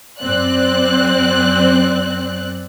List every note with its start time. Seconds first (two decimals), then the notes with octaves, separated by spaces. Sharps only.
0.20 F#2 C4 D5 F#6